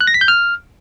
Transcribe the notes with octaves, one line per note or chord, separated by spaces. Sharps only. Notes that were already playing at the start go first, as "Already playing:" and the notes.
F#6
A#6
B6
G6
F6